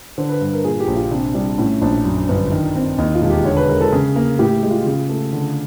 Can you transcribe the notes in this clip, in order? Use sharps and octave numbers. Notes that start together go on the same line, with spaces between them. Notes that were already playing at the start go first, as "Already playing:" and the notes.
D3 C5
B4
G2
A#4
A#2 G#4
G4
A#1
F4
C3 D4
G3 D4
A2 C#4
A#1 D4
F#2
G1
D#3
C4
D#2 D#4
F4
E1
G4
D3 C#5
B4
G#3 A#4
A4
C#3 G#4
A#3
A2 G4
G#3
F4
C#3
A3
D3